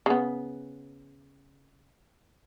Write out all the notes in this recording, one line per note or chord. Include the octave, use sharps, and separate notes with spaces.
C#3 B3